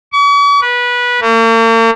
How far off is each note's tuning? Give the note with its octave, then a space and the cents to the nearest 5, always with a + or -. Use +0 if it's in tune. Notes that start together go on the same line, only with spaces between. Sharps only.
C#6 +45
B4 -20
A#3 -45